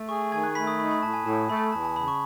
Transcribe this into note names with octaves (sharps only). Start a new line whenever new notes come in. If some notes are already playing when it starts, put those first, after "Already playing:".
Already playing: A3
G#4 C#6
D#3 G#5 G#6
F#6
A3 B5 B6
D#6
D#4 B5
B5
A2 A5
G#5
A2 A5
A3 B5
E2 A5
A5
C#3 B5
C#6